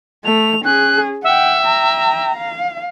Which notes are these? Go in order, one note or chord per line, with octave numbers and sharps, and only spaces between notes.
A3 F7
C#4 G#4 F#6
E5 F#5 G5
G5 A#5
F5